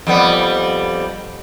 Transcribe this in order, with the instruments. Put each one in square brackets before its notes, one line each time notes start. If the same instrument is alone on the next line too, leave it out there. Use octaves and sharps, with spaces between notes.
[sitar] F2 G3 B3